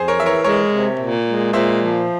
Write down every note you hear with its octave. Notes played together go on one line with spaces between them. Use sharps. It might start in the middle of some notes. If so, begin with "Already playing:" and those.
Already playing: F2 G#4 C5
A#4 C#5
E3 E5
A#4 C#5
G#3 A#4 C#5
C3
A#2
G#3
A#2 C5 E5
F3